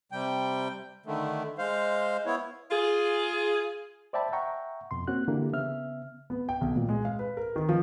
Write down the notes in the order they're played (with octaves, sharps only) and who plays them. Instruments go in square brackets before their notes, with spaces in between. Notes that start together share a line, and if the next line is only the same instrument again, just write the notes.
[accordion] C3 G3 G5
D3 D#3 A3
G#3 C5 F5
B3 E4 C#5
[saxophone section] F4 G#4
[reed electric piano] C5 D5 E5 G5 A5 B5
E5 F#5 G5 A#5 C#6
F2 B2 C6
A#3 C4 C#4 F#4 F#6
D3 E3 A#3 D4 E4 G4
C#3 B3 E5 F6
[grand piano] B3
G5
B1
A#2
G#3
F5
B4
A#4
D#3
F3